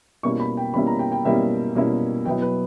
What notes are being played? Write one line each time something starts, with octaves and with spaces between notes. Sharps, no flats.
B2 G3 A#3 C#4 E4 C#6
B5
G5
B2 G3 A#3 C#4 E4 B5
A#5
G5
G5
B2 G3 A#3 C#4 E4 E5
B2 G3 A#3 C#4 E4
B2 F#3 B3 E4 G5
B4